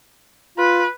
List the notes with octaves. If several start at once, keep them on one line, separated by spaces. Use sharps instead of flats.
F4 B4